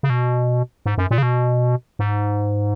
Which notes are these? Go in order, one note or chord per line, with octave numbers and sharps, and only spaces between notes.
C#3
B2
G#2
F#2
A#2
C#3
B2
G#2